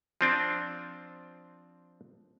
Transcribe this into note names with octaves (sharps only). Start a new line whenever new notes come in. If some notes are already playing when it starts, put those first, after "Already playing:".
F3 C4 D4